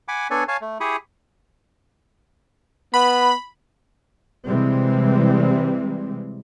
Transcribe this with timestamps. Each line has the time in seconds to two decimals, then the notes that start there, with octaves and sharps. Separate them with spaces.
0.08 F#5 G#5 B5 D6
0.31 B3 D4 A4 C#5 D5 G#5
0.48 C#5 F5 G#5 A5 C#6
0.61 A3
0.80 E4 G4 G#4 B5 C#6 D#6
2.94 B3 B5
4.46 C3 E3 G3 G#3 C4